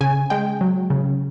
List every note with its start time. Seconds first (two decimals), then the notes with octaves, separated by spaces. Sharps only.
0.01 C#3 G#5
0.30 G#3 G5
0.61 F#3
0.90 C#3